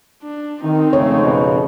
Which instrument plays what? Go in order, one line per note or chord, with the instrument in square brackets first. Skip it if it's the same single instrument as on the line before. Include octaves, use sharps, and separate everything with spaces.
[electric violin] D4
[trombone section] D#3 [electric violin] C4 D#4
[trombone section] F2 G#2 C#3 [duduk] A3 [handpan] C#5
[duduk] B2